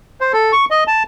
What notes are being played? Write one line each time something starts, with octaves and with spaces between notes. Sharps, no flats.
C5
A4
C#6
D#5
A5